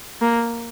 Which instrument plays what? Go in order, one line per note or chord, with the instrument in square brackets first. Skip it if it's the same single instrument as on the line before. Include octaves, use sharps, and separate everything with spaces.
[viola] A#3